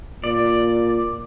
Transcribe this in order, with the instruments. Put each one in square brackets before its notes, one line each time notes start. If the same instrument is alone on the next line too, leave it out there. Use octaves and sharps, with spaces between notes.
[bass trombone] A#2 [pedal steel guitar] D5